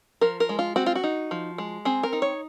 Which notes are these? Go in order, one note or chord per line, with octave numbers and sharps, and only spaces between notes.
F3 A#4
A#4
G#3
F4
C4 F#4
F4
F#4
D#4
F3
G#3
C4 G#4
A#4
D#4
C#5